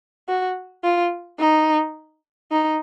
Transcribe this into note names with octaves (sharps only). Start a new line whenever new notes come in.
F#4
F4
D#4
D#4